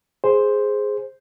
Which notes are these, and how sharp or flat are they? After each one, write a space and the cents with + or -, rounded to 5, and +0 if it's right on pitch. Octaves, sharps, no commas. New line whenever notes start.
G#4 +0 C5 +0